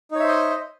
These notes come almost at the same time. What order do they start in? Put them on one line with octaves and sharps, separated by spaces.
D#4 C#5 E5 C5 D#5